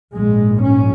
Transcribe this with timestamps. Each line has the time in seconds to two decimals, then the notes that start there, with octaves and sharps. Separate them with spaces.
0.16 A#1 G#2 G#3
0.63 C#4